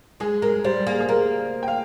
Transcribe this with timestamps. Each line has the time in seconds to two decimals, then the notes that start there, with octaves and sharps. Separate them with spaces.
0.20 G#3 G#4
0.42 G#3 A#4
0.64 G3 C5
0.86 A#3 G#4
1.00 G#4
1.09 A#3 A#4
1.63 G5
1.68 F5